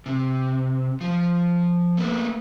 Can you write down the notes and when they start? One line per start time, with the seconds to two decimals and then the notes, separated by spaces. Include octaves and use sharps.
0.06 C3
1.01 F3
1.97 A3 A#3 B4